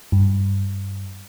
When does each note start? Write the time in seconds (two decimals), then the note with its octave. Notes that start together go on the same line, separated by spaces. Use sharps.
0.12 G2